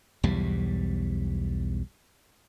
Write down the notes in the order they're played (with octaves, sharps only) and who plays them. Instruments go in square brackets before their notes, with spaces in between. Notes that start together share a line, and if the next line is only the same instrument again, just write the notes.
[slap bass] B1 E2 G#2 G3